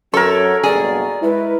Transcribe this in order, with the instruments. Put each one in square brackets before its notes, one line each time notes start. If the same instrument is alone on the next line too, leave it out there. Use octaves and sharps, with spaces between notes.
[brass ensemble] F#2 F#3 [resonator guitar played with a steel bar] A4 [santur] A#4 C#6 [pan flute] C#5
[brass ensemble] F#1 G2 B2 [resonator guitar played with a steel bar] G#4 [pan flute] D5
[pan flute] G#3 [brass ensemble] E4 B4